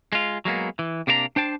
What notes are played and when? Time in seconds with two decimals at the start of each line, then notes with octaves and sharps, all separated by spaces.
0.13 G#3 F4
0.45 F#3 G#3 A#3 B3
0.79 E3
1.07 C3 A#3 D4 A#4 A#5
1.36 D4 C5 G5 A5